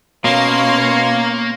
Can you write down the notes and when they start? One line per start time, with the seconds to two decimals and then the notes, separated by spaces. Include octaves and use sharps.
0.24 B2 A#3 C#4 C#5 F5 A#5 C6